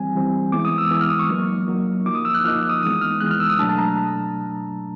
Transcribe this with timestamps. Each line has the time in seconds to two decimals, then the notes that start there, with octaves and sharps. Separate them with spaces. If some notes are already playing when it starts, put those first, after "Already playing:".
Already playing: E3 G3 C4 G#5
0.15 E3 G3 C4
0.52 E3 G#3 B3 D6
0.65 D#6
0.78 E6
0.91 E3 G#3 B3
1.01 F6
1.10 D#6
1.19 C#6
1.29 F#3 A#3 D#4
1.68 F#3 A#3 D#4
2.05 F3 A#3 D#4 D6
2.15 D#6
2.25 E6
2.35 F#6
2.44 F3 A#3 D#4 F6
2.69 D#6
2.83 E3 G#3 B3 D#6
3.01 F6
3.20 E3 G#3 B3 F#6
3.31 F6
3.40 E6
3.50 D#6
3.59 B2 F#3 A3 D4 A5
3.69 A5
3.78 A#5